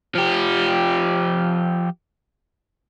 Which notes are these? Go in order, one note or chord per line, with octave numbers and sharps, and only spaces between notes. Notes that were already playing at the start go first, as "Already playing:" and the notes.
F3 G4